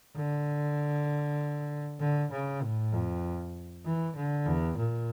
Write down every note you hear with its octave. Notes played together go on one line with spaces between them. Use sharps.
D3
D3
C#3
A2
F2
E3
D3
E2
A#2